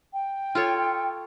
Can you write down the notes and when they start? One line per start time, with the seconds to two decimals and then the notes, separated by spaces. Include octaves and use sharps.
0.13 G5
0.55 F4 A4 C#5